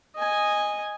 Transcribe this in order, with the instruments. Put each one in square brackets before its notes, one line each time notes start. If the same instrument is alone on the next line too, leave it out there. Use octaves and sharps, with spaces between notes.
[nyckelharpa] D#5 G#5